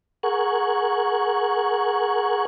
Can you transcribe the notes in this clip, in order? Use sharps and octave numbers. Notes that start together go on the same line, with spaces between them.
G#4 A#4 F#5 C#6